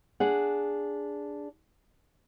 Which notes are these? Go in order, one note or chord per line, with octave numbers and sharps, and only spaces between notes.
D4 G#4 F#5